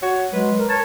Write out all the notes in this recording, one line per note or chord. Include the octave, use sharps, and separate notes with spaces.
F#4 C#5
F#3 G#3 B4
A#4
C#5 A5